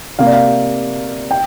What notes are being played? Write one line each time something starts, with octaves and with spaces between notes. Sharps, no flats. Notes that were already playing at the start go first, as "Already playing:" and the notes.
C3 A#3 F5
D5
F5
G5